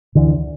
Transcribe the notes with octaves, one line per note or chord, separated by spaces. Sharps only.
D2 D3 E3